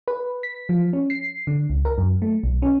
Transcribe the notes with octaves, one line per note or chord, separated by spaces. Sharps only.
B4
B6
F3
C#4
C7
D3
C#2
A#4
F#2
A3
B1
C#4